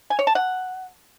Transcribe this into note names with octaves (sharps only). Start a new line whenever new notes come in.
G#5
C#5
A5
F#5